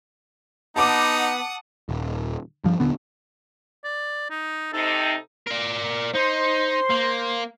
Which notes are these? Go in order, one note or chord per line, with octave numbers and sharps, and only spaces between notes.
B3 D#4 F#5 A5 B5 D6 D#6
D#1
G2 F3
D#1 D3 B3
D5
D#4
C3 D#4 A4
A#4 D5
D#4 C5 C6
A#3